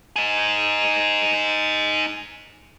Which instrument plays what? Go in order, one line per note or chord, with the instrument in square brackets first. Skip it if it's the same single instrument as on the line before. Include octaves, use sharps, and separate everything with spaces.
[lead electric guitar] D#4 G#4